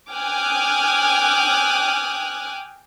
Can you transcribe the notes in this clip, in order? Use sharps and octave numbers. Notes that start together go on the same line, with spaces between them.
G5 G#5 D6 D#6 F6 F#6